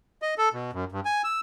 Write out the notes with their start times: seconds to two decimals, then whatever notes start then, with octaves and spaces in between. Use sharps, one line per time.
0.22 D#5
0.38 A4
0.53 B2
0.73 F#2
0.92 G2
1.05 G#5
1.24 E6